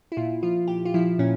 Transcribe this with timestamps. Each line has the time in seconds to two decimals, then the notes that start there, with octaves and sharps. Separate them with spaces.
0.12 E4
0.17 A#2 F4
0.43 F3 F4
0.68 A#2 G4
0.85 F4
0.94 F3 E4
1.19 A#2 C#4